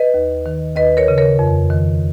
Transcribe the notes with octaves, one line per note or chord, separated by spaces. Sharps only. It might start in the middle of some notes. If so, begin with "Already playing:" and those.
Already playing: B4 D#5
D#2
D#3
D#2 B4 D#5
A#4 C#5
C#3
A#4 C#5
F2
D#3